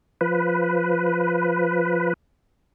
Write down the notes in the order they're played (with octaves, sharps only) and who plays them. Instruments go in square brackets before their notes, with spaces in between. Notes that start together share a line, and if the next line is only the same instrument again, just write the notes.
[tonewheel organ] F3 B4